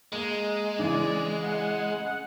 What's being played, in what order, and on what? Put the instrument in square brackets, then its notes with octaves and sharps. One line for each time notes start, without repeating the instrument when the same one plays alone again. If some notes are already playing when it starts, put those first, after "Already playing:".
[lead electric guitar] G#3 [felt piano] A#3
[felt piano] C#3 E3 C4 [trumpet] D5
[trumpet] F#5